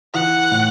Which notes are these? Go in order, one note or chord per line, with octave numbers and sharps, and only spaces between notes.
E3 F#5
A2